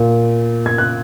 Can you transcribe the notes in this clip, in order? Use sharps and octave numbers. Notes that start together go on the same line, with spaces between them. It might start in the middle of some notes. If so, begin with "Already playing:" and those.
Already playing: A#2
G#6
F#6